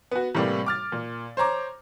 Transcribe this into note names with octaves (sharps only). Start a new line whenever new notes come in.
B3 F#4
A2 C3 E3 G3 A#3
D6 F6 A6
A#2
C5 C#5 A#5 D6